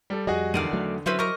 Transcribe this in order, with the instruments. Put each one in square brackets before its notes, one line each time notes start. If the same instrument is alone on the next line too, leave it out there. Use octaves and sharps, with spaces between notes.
[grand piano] G3 A4
[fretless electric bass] F2 G3 [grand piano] F#4 G#4 D#5
[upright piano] E2 D#3 D#7 [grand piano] D3 [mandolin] F#4 D5 F5
[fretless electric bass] F#3 A3
[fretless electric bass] F#3 [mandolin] C4 C#4 B4 [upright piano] E4 C5 E5
[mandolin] G4 A#4 D#5 [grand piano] C#6